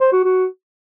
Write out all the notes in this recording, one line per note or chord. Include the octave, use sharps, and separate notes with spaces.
C5
F#4
F#4